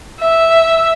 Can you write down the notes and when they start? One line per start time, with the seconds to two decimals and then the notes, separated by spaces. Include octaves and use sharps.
0.21 E5